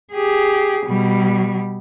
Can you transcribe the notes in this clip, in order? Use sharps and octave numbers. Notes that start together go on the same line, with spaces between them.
G4 G#4
B2 G3